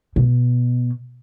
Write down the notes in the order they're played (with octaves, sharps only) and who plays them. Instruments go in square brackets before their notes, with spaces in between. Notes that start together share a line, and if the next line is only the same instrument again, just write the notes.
[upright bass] B2